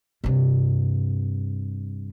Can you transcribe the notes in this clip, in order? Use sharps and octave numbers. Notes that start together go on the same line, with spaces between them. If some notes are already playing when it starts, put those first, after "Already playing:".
G2 C3